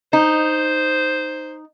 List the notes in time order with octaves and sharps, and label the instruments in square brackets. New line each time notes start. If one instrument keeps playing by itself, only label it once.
[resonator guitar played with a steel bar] D#4 [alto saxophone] C5